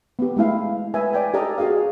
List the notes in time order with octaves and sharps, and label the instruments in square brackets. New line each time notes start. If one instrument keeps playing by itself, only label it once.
[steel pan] B3 G4
G#3 A3 E4 F5
B4 E5 G#5
D5 G5 G#5
G4 A4 D5 D#5 A#5
F#4 G#4 D#5 F5